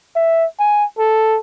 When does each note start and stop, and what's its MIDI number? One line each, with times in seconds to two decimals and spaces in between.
0.16 0.45 76
0.59 0.84 80
0.98 1.39 69